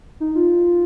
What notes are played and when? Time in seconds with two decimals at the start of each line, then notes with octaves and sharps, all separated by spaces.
0.20 D#4
0.35 F4